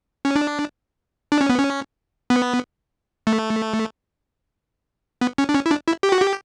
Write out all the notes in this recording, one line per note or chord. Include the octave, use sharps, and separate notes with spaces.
C#4
D4
D4
C#4
B3
C#4
B3
A3
B3
C#4
D4
C#4
E4
D4
E4
G4
F#4
G4